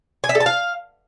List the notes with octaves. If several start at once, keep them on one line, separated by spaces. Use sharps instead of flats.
G#5
E5
A4
A5
F5